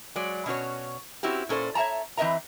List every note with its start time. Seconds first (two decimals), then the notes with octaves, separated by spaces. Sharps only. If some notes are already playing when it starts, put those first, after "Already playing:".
0.16 F#3 G#3 D5
0.46 B2 C#4 F#4 C#5
1.23 C4 C#4 E4 F#4 G4
1.49 A#2 C#4 A4 C5 D5
1.75 C#5 E5 F#5 A5 A#5
2.17 E3 C4 B4 D#5 E5 A#5